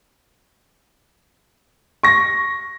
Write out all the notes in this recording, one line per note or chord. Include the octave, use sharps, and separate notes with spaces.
C#6 A#6